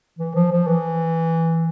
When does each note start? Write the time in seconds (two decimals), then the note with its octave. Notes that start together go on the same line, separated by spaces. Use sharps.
0.19 E3
0.35 F3
0.52 F3
0.67 E3